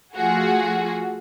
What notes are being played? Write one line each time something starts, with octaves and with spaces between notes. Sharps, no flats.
F3 A3 F4 F#4 G#4